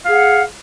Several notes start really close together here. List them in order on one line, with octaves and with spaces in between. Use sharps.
F5 G#4 F#5